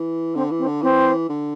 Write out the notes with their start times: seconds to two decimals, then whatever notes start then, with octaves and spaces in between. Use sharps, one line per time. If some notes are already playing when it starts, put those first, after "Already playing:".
Already playing: E3
0.35 D3 C4
0.50 E3
0.58 C4
0.66 D3
0.82 E3 C4
1.29 D3